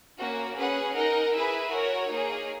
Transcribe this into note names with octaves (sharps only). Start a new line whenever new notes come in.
A#3 C#4 F#4
C#4 G#4 B4 F#5
D#4 A#4 D#5 F#5
E4 G#4 B4 E5 G#5
F#4 A#4 C#5
A#3 D#4 G#4 C#5